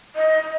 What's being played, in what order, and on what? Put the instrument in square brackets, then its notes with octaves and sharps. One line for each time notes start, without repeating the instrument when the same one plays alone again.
[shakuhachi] D#5